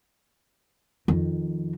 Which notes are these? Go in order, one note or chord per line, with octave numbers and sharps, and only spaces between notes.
F2 D#3